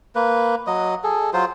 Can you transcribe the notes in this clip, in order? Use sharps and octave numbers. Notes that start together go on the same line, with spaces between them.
A#3 B4
F#3 D#5
G#4 A4
F#3 F4 C5